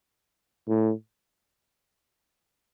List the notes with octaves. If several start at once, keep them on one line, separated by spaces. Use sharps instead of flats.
A2